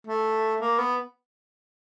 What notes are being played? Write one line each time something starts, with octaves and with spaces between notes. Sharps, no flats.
A3
A#3
B3